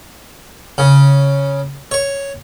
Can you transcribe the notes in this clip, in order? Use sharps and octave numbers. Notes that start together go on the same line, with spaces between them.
C#3
C#5